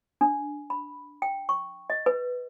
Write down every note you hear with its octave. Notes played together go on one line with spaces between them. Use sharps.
D4
B5
G5
C#6
D#5
B4